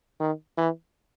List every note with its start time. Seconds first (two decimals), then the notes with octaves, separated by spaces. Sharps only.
0.20 D#3
0.58 E3